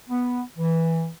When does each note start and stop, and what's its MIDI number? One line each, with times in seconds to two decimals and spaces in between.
0.08 0.41 59
0.58 1.06 52